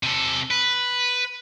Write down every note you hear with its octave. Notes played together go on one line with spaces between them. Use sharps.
C3 A4
B4